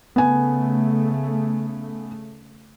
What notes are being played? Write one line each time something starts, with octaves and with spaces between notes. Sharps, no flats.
C#3 A3 B3 G#5